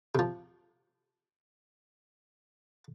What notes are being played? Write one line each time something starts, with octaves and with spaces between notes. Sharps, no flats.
C3 F3